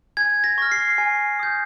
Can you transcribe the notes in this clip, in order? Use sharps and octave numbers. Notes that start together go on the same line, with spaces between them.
G#5 G#6
A#6
C#6 F6
C7
G#5
D#6 G6